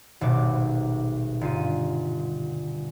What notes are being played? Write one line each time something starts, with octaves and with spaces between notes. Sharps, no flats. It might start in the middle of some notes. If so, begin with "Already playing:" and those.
D#1 G#1 B2 D6
G1 F4 D#7